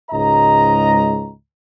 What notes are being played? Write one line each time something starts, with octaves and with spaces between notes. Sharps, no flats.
C#2 G#2 D#5 A#5